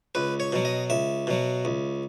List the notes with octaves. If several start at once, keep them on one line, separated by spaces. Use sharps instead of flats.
C#2 B4
C#5
B2 F#3
D#5
C#2 E5
B2 F#3
C#2